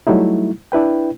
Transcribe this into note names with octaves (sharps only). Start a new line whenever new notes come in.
F#3 G3 A3 D#4 E4
D4 E4 B4 G5